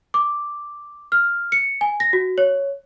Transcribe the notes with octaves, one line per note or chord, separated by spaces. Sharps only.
D6
F6
C#7
G#5
A#6
F#4
C#5